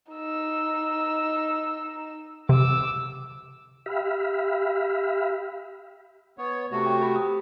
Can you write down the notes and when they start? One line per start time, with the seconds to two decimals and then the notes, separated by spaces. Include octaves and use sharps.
0.12 D#4 E6
2.49 C3 D6 E6
3.86 G4 E5 F5 B5
6.38 B3 C#5
6.72 C3 A3 F#4
6.86 G5
7.02 G4 B5
7.16 D#6